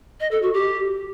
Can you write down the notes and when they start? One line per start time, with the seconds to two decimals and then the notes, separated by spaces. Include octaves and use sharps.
0.20 D#5
0.31 A4
0.42 F#4
0.53 G4